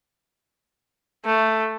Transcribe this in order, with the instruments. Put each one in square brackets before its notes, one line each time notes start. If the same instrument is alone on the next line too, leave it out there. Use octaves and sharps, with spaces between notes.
[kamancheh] A3